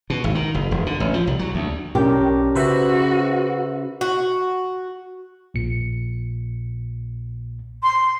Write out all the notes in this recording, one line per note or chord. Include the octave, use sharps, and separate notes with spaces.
B2
G#1
D#3
F#1
E1
D3
A1
F3
C2
F#3
D2
B1 C#4 D4 G4 A#4
C#3 F#4 B4 C5 E5
F#4
A#1 A#2 C#7
C6